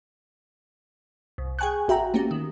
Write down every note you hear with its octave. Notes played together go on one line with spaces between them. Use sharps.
C2
G#4 G5 G#5 C#6 F#6
A1 F#4 E5 G5 A#5
A3 A#3 C#4 G4
D#3